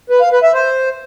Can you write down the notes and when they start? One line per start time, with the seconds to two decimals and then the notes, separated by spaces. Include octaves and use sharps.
0.10 B4
0.21 F5
0.32 B4
0.43 E5
0.54 C5